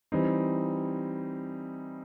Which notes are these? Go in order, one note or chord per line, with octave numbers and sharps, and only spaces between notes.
E3 G3 C4 D#4